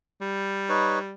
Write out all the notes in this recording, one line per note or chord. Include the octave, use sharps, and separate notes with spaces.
G3
D#4 B4 C#5